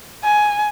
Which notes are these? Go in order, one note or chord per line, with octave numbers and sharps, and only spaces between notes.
G#5